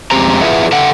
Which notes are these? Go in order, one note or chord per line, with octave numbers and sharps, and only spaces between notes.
F2 G#3 C4 G4 C5 A#5
E4 F4 G#4 B4 E5 F#5
A4 E5 F#5 G5